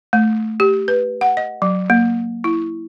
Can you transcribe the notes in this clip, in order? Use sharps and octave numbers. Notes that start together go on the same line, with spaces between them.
A3
G4
B4
F#5
D#5
F#3
A#3
E4